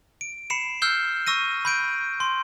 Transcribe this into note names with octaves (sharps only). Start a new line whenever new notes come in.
D7
B5 C7 C#7 E7
E6 F6 G6 C7 G7
C#6 E6 A#6 D#7
B5 G6 D7
C6